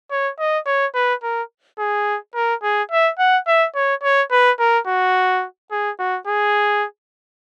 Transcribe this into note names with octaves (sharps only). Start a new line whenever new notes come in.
C#5
D#5
C#5
B4
A#4
G#4
A#4
G#4
E5
F#5
E5
C#5
C#5
B4
A#4
F#4
G#4
F#4
G#4